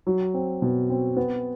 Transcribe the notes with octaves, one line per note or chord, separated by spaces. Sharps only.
F#3
C4
B2
C4
B3